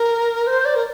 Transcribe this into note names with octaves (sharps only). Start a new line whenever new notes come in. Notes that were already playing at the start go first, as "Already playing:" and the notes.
Already playing: A#4
C5
D5
A#4